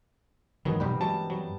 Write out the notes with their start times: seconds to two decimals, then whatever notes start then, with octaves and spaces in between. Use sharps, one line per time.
0.65 G#2 D#3 E3 F#3 B3 G#4
0.80 B1 G2 E3 G3 A#3 G4 B4
1.01 F#3 G#3 A5
1.30 F#3